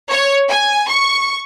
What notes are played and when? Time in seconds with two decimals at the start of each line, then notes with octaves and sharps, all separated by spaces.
0.10 C#5
0.48 G#5
0.87 C#6